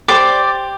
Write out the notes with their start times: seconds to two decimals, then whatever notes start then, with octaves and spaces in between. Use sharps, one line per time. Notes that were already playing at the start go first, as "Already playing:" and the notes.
0.08 G4 C5 D5 D6